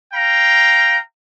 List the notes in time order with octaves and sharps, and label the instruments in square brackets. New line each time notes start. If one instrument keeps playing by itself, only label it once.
[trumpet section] F5 G5 A#5